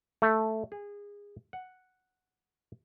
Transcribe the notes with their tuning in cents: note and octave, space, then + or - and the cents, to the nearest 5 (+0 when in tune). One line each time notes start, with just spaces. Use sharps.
A3 +0
G#4 -25
F#5 +0